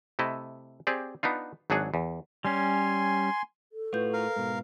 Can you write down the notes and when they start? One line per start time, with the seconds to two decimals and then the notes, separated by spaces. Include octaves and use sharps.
0.19 C3 A3 E4 D#5
0.87 C4 G4 G#4 D5
1.23 B3 D4 D#4 F4
1.70 G#1 F#3 D4 G#4 F#5
1.94 E2
2.45 G3 C#4 G#5 C6
3.73 A4
3.93 A2 F4 F#4 B4 G6
4.13 A#4 F5
4.36 G#2 B2